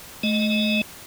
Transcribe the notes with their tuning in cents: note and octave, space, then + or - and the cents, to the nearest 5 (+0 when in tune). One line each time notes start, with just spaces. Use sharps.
A3 -30 D#5 -5